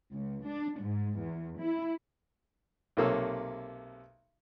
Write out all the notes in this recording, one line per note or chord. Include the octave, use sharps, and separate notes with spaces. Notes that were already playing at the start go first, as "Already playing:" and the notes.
C#2
D4
G#2
E2
E4
B1 C3 A#3 A4 C#5 E6